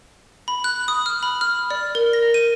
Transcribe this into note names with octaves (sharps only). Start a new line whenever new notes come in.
B5
F#6
D#6
F6
B5
F6
D5
A#4
A#6
D#7